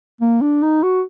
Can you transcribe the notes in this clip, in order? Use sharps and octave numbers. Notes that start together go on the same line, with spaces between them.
A#3
D4
D#4
F#4